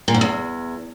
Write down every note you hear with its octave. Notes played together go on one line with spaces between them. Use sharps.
A#2
G#2
E2